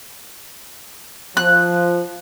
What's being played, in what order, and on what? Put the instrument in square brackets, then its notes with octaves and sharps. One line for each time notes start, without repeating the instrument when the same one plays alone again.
[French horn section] F3 [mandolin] F#6